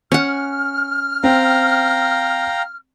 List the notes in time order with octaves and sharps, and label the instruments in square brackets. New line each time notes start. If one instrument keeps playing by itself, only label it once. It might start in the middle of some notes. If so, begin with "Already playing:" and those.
[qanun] C#4 F#5 [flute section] F6
[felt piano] C4 [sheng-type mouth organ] F5 G5 A#5